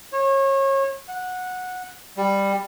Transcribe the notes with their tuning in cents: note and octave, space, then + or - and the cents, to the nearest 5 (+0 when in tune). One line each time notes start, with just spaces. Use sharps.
C#5 -30
F#5 -15
G3 +10